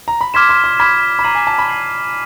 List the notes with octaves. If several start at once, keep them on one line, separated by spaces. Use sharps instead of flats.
A#5
B5
C6 D6 F6 G#6 B6 E7
C6
C6
B5 D6 F6 G#6 B6 E7
B5
A#5 G#6 C7 D#7 F#7
G#5
A5
B5
G#6 C7 D#7 F#7